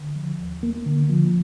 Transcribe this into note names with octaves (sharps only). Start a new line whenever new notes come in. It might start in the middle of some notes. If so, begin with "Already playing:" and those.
Already playing: D3
F3
D#2
A#3
D3
F3